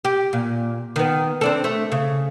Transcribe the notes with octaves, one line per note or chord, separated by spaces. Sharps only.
G4
A#2
D#3 B3
C4 D4 A4
A3
C#3